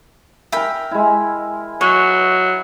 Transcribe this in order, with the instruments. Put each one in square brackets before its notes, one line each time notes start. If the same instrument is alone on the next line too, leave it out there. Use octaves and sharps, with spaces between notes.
[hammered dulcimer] A#4 A#5 [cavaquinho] E5 G5 B5
[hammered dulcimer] G#3 E4
[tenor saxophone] F#3 [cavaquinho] C#5